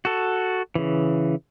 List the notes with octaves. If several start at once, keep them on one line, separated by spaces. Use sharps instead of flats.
F#4 A4
C#3 E3